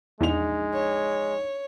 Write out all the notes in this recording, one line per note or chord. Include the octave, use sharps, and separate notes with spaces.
A#1 E2 G#3 D#4 F7
C#5